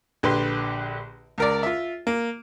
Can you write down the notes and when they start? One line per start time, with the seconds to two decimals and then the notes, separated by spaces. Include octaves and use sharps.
0.23 A#1 D3 G4 B4 C6
1.38 C#2 A#4 D5
1.63 F4 E5
2.07 A#3